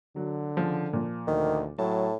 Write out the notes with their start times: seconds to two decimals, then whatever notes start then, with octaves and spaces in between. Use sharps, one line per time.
0.16 D3 F#3
0.57 C#3 F3
0.93 A#2 F3
1.27 D2 D#3
1.79 A2 F#3 A5